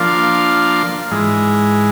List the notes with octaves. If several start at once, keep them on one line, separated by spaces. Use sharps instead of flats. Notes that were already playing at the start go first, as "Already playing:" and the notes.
Already playing: F3 A#3 D4 F4
G#2 E3 G#3